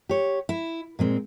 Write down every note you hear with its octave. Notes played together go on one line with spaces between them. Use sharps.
G4 C#5
E4
A#2 G#3 C4